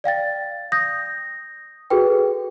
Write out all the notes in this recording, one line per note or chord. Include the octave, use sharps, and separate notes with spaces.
D5 F5 G5 A6
D#6 G6 A#6
F#4 G#4 A4 B4 G5